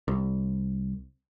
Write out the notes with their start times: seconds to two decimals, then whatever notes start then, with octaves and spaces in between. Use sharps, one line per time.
0.08 C2